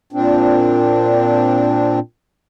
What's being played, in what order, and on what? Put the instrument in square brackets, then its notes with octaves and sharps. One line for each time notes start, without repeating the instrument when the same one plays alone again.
[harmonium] A#2 C4 D4